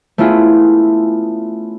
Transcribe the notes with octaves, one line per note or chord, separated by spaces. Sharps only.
A3 B3 C#4 E4 F4 G#4